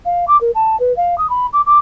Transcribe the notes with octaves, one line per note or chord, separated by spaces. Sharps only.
F5
D6
A#4
A5
B4
F5
D#6
B5
D6
D6